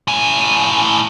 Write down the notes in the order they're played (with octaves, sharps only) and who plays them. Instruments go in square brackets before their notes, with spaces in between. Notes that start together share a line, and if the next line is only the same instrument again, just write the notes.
[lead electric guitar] A2 G#5